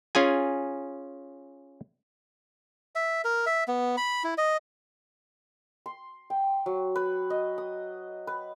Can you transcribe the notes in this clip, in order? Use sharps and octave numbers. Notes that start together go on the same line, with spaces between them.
C#4 F4 G#4 G#5
E5
A#4
E5
B3
B5
E4
D#5
C6
G5
F#3
B4
D#5
D#6
B4